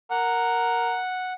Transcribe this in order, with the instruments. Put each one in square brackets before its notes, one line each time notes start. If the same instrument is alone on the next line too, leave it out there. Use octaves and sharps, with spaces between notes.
[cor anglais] A#4 [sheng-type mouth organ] F#5